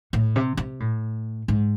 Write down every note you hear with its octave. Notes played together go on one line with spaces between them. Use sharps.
A2
C3
C3
A2
G#2